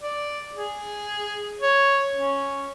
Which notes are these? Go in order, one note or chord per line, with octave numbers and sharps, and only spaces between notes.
D5
G#4
C#5
C#4